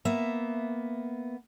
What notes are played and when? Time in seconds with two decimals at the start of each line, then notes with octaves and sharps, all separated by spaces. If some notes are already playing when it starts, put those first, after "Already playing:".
0.05 A#3 B3 E5